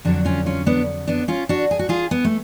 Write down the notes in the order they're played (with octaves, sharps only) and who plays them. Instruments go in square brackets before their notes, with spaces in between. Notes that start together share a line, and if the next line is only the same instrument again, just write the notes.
[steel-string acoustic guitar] F2 D3 F#3 D4 F#4
C#4 F4
C#4 F4
B3 D4
B3 D4
C#4 F4
D4 F#4
G#4
F#4
F4 G#4
B3
A3